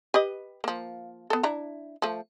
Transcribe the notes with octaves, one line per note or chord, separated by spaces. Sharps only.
G4 B4 D#5
F3 A#3
B3 A4
D4 E4 A#5
F3 A3